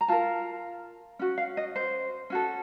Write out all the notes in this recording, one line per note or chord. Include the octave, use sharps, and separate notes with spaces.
A#5
F4 A#4 A5
C#4 F#4
F5
D#5
C5
C#4 F#4 A4